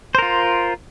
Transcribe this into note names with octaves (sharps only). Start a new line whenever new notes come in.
F4 A#4 C5